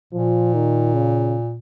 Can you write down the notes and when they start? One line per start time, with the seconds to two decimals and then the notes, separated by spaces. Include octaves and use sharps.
0.13 A#2 F3
0.54 D#3
0.94 C#3